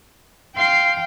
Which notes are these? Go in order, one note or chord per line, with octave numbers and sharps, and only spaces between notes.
F5 G5 C6 C7